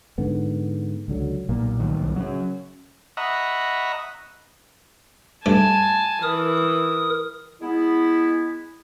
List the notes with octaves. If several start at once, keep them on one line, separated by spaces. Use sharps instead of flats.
G#2 D3 B3
C#2 D3 F#3
B1 A#2 A#3
C2 A2 D#3
C#3 F#3 C#4
D#5 E5 F#5 A#5 B5 C#6
G2 A3 D4 G#5 A5
E3 A#4 D#6
G#3 B3 E4